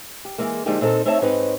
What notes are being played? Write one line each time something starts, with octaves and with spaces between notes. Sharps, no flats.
G4
E3 G#3 A#3
D3 F3 G#3 A#3 D#4 G4
A#2 C4 D#4 A4
A3 C4 D#4 C#5 E5 A5
G#2 C4 D#4 B4 C#5